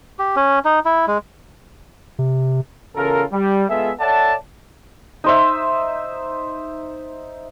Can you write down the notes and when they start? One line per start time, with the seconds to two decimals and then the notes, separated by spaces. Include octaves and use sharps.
0.19 G4
0.36 C#4
0.65 D#4
0.85 E4
1.07 G#3
2.19 C3
2.95 E2 C#3 F4 A4 A#4
3.32 G3
3.69 G#3 B3 F4 G#4 A4 E5
4.00 A4 C#5 D5 E5 F#5 A5
5.24 D#4 C5 E5